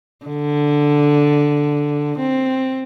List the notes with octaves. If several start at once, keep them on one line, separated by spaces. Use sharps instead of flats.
D3
C4